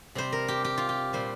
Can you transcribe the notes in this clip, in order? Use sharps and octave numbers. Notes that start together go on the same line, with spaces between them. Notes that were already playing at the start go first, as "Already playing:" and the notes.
C3 G3 C5
A#4
G4
G4
F4
G4
A#2 G3 C5